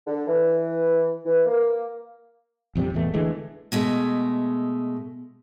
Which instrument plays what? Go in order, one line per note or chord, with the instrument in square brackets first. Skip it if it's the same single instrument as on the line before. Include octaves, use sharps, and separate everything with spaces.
[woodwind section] D3
E3
E3
A#3
[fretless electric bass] A#1 F2 C3 G3
A1 E2 B2 A3
D3 E3 G#3 A3
[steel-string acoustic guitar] B2 G#3 A3